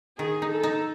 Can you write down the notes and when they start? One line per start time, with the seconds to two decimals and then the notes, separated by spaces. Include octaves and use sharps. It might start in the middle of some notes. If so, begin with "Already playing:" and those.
0.19 D#3 G#4
0.42 D#4
0.52 A4
0.63 D#4